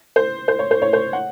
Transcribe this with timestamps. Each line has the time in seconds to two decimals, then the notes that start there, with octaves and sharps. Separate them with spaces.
0.16 C5
0.48 C5
0.59 C#5
0.71 C5
0.82 C#5
0.93 C5
1.13 F#5